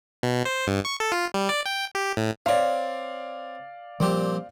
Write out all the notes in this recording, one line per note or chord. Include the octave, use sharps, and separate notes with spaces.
B2
C5
G2
C#6
A4
F4
G3
D5
G5
G4
A2
C4 C#5 D5 F5
A#2 F3 G3 C4 G4